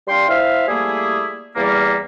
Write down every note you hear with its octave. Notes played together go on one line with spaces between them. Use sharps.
G3 D4 F5 G5 C6
E4 C5 E5 F5
G3 A3 A#3 E4 G#4
E2 G3 A#3